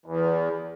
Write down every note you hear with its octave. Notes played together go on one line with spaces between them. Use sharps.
E2